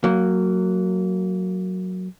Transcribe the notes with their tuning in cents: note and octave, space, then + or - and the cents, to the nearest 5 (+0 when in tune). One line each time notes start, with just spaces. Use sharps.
F#3 +0 A#3 -20